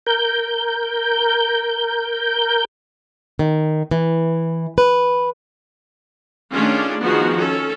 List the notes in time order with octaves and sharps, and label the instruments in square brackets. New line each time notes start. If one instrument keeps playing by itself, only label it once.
[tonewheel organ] A#4 G6
[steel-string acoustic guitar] D#3
E3
B4
[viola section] D#3 A3 C#4 D4 F4 G#4
D#3 F3 B3 F#4 G#4
C#4 A4